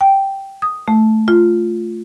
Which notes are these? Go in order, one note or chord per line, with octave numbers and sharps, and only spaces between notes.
G5
D#6
A3
F4